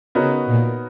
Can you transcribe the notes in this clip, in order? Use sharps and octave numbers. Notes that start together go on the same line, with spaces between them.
C#3 B3 D#4 F#4 A#4 C#5
A#2